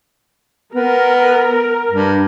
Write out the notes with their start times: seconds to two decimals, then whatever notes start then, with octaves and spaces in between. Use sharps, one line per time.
0.75 B3 A#4
1.91 G2